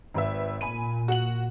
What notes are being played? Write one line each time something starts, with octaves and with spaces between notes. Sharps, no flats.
G#1 B4 E5
A#2 G#5 B5 D#7
F#4 F#5 F#7